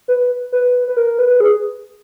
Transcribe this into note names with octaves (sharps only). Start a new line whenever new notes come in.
B4
B4
B4
A#4
B4
G#4